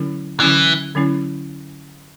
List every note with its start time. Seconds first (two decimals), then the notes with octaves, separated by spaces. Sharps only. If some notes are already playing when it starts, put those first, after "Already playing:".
Already playing: D3 F#3 C#4 E4
0.40 D3 E3 F#3 C#4 E4
0.95 D3 F#3 C#4 E4